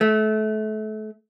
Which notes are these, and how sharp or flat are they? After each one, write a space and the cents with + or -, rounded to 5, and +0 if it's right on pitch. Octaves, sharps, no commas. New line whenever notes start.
A3 -30